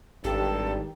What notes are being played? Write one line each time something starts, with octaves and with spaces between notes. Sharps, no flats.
G#1 G2 D#3 G4 A4